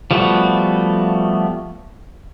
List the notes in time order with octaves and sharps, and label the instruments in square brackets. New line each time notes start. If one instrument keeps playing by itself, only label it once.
[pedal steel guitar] F3 G3 A3 B3 F#4